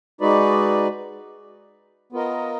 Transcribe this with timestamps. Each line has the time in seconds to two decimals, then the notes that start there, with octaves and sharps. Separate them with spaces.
0.21 G#3 D#4 F#4 B4 D5
2.12 B3 F4 A#4 D#5